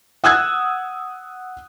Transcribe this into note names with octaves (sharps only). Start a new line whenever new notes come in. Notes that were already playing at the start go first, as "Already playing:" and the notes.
F#5 D#6 E6 F#6 G#6